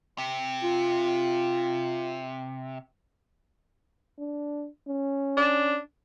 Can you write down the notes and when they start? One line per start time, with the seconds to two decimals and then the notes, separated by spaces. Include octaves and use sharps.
0.18 C3
0.63 F4
4.18 D4
4.88 C#4
5.37 D4